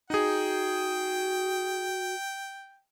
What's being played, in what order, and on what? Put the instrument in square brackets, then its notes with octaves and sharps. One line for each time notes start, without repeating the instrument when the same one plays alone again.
[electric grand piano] D#4 G#4 [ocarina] F#4 [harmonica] G5